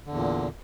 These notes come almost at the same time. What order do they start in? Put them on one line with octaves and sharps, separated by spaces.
D3 E2 A#2